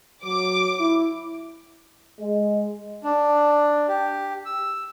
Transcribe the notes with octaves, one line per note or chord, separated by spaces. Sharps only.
F#3 D6
E4
G#3
D4
G4
E6